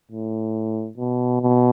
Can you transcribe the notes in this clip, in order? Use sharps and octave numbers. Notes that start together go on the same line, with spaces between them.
A2
B2
B2